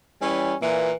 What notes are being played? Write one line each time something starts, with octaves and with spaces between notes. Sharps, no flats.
E3 G3 C#4
A#2 E3